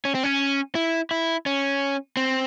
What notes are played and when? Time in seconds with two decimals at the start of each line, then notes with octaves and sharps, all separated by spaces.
0.05 C#4
0.15 C4
0.23 C#4
0.75 E4
1.11 E4
1.46 C#4
2.17 C4